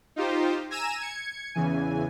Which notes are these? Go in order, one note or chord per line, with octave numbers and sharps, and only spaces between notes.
D#4 F4 G4 C5
G#5 A#5 E6 D#7 E7
G#6 C#7
E2 C#3 E3 G#5